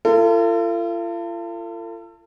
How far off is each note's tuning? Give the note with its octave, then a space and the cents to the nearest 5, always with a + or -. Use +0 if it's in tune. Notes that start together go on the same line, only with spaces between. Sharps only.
F4 -40 A4 +35